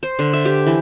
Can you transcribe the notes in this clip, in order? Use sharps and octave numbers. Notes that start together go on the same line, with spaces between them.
C5
D3
E5
G4
E3